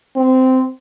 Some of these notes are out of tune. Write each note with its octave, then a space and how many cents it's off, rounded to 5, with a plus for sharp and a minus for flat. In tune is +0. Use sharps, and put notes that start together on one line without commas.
C4 -15